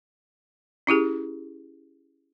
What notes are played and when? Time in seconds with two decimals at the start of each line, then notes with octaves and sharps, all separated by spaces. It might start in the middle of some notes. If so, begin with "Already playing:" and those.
0.87 C#4 E4 G4 G#4